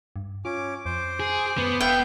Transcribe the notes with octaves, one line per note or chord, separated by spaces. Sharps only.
G2
C#4 F4 D6
F2 C5 D6
G#4
F#2 B3
E1 E5 F5 G5